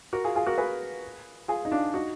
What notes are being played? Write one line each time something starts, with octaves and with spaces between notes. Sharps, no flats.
F#4 A#4
F4 G#4
F4 G#4
F#4 A#4
G#4 B4
F4 G#4
D#4
D4 F4
D#4 F#4